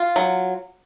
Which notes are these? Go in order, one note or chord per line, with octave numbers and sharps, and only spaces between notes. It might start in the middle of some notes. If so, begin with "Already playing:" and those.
Already playing: F4
F#3